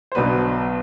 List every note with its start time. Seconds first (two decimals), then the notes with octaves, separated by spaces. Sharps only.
0.12 C5
0.15 B1 B2 F#3 B3 D4 B4